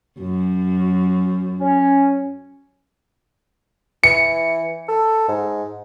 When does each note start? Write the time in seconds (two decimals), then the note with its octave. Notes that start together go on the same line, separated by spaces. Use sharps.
0.19 F#2
1.60 C#4
4.04 E3 C#7
4.88 A4
5.28 G#2